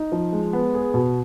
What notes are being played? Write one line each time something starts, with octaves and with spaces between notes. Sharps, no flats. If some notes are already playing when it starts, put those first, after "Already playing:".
Already playing: D#4
F3
G#3
B3
G#4
B2